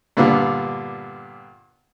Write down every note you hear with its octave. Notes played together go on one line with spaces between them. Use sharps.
G2 A#2 D3 B3 F4